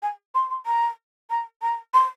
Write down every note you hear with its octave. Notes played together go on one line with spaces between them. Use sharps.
G#5
C6
C6
A#5
A#5
A#5
C6